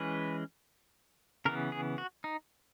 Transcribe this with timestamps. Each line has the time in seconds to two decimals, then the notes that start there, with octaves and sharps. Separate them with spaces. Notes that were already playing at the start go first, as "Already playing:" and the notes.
Already playing: E3 G#3 C#4 B4
1.45 C#3 E3 B3 A#4
1.72 G#4
1.98 F#4
2.24 D#4